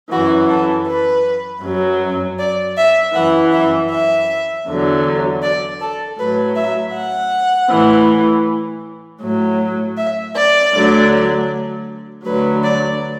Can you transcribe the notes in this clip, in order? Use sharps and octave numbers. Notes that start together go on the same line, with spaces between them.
F#2 E3 F#4
A4
B4
F#2 F#3
D5
E5
F#2 E3 F#5
E5
E5
E2 D3 F#3
D5
A4
A2 F#3 B4
E5
F#5
A2 E3
A2 F#3
E5
D5
D2 D3 F#3
D2 D3 F#3 B4
D5